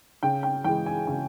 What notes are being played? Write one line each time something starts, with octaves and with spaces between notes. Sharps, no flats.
C#3 G5
G5
E3 G#3 G5
G#5
C#3 G#5